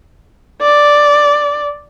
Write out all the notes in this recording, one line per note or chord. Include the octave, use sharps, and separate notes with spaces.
D5